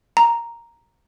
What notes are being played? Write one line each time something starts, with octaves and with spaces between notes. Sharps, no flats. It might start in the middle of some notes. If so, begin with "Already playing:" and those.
A#5